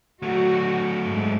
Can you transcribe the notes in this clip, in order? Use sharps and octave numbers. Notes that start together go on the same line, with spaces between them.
F#3 A3 F#4
G#2